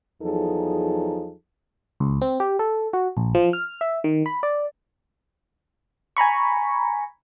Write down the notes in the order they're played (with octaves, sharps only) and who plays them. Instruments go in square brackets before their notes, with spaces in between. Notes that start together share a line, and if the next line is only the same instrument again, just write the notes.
[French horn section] E2 F3 F#3 D#4 G#4 A4
[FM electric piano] C#2
C4
G4
A4
F#4
A#1
F3
F6
E5
D#3
B5
D5
G#5 A#5 B5 C#6